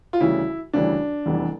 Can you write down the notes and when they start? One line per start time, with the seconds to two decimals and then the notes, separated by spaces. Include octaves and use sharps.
0.13 F4
0.20 D2 C#3 E3 G3 E4
0.73 D2 C#3 E3 G3 D4
1.26 F1 E2 E3 G3